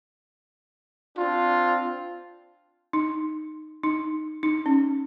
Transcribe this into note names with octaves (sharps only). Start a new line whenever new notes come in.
C4 D4 F4
D#4
D#4
D#4
C#4